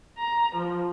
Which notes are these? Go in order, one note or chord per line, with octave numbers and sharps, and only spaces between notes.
A#5
F3